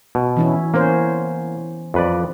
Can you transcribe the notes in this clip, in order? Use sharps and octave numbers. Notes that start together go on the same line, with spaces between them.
B2
E3 C#4 E4
A#3 B3 C#4 C5
F2 B4 D5